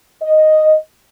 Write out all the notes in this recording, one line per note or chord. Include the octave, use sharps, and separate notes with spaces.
D#5